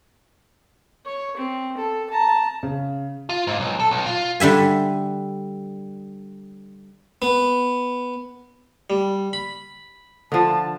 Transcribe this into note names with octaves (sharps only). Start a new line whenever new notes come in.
C#5
C4
A4
A5 A#5
C#3
F4
G#2
B1
A4
B1
F4
D3 G3 E5 G#5
B3
G3
B5
D3 F3 A5